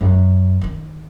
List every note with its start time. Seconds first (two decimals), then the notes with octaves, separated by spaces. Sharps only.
0.01 F#2
0.61 D#3 D#4